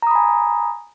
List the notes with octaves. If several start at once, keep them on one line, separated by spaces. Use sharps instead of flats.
G#5 A#5 B5 D#6